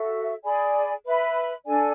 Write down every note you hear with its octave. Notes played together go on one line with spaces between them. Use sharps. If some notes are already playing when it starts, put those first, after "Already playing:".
Already playing: F#4 A4 E5
G#4 D5 G#5 B5
B4 E5 B5
D4 A4 D5 G#5